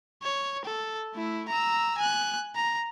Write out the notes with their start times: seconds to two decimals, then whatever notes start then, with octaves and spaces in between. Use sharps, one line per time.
0.23 C#5
0.65 A4
1.14 A3 E4
1.48 A#5 E6
1.98 G#5 F#6
2.56 A#5